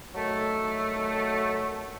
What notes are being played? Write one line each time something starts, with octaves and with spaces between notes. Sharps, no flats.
D#3 F#3 A3